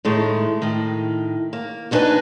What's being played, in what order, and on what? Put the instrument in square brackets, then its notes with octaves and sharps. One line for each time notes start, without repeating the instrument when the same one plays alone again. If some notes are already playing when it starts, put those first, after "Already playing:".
[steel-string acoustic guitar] A2 D#3 G#3 A3
A2 D#3
A#3
F2 A3 D4 D#4 B4 G#5